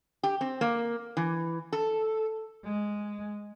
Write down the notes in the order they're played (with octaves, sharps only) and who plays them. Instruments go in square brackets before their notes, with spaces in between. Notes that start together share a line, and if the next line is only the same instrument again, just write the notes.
[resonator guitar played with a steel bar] G4
C4
A#3
E3
A4
[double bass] G#3